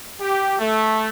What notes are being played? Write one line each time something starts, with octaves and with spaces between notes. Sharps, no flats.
G4
A3